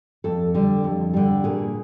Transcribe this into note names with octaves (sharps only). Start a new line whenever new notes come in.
F2 A4
D3 G3
F2
D3 G3
A#2 G#4